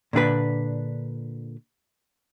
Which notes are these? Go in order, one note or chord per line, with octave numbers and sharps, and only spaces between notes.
A#2 D3 D4 B4